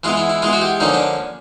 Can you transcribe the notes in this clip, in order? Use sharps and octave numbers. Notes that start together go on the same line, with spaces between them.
E3 G#3 B3 F4
E4
E4
E3 G#3 B3 F4
F#4
G4
D3 F3 A#3 C#4 D#4
D4